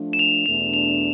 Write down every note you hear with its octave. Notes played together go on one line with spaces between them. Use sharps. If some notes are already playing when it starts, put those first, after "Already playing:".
Already playing: F3 A3 D4
E7
F7
E2 B2 A3 D4 F7
F7